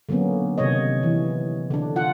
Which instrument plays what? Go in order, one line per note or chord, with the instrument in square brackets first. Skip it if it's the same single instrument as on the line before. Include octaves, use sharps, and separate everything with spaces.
[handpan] D3 F#3 A#3 B3 C#4
C3 D#3 C#5 D#5
E3
D3 D4
F4 F#5